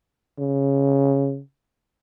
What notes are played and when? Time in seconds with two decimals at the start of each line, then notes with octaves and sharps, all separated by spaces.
0.39 C#3